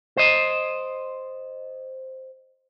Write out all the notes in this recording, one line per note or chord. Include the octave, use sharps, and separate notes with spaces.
C5 D#5